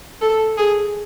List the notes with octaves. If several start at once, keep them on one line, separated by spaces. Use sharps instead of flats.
A4
G#4